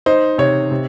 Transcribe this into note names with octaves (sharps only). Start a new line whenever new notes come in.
D#4 C5
C3 C#5
C3